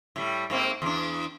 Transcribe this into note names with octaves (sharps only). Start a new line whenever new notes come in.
A2 G3
G#2 A#3 C4
E2 D4